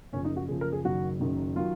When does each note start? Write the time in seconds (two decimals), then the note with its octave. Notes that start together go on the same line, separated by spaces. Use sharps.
0.13 F#1 F#2 F3 C#4
0.25 D#4
0.36 F#4
0.48 F#1 F#2 F3 G#4
0.61 A#4
0.73 G#4
0.84 F#1 F#2 D#3 F#3 F#4
1.20 F#1 F#2 D#3 F#3
1.56 D#3 F#3 F4